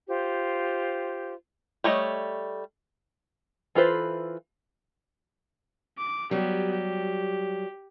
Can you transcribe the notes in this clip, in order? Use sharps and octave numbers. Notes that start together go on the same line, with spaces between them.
F4 G4 C5
G3 A3 C#5 D#5
E3 F4 A4 B4 C5
D6
F#3 G3 B3 G4
G4